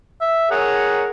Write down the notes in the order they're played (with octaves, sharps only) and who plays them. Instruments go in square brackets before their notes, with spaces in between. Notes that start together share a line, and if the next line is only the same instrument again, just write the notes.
[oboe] E5
[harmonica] G#4 A#4 C#5 [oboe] F#5